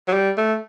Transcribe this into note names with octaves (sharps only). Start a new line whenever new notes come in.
F#3
G3
A3